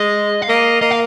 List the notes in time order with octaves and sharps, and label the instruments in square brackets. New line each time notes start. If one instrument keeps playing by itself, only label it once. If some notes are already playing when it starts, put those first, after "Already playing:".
Already playing: [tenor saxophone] G#3 [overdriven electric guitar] D#5
[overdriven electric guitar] F5
[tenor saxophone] A#3 [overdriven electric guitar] D#5
[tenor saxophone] A#3 [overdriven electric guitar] D#5
[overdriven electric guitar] F5